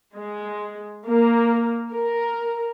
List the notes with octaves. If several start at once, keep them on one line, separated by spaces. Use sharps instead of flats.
G#3
A#3
A#4